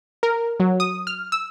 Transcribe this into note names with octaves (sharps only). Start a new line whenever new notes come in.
A#4
F#3
D#6
F6
E6